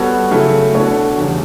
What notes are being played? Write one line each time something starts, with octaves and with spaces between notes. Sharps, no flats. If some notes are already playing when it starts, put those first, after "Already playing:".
Already playing: G3 B3 F#4 A4 C#5
C#3 F#3 A3 E4
B2 A3 D4 F#4 C#5
E2 C#3 G3